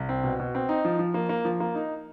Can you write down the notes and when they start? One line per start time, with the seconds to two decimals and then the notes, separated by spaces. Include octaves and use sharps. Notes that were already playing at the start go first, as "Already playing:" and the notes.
Already playing: C2
0.09 C4
0.24 B2
0.40 B2
0.55 C4
0.69 D#4
0.85 F3
0.99 F3
1.14 A#3
1.29 A#3
1.45 F3
1.60 A#3
1.75 D#4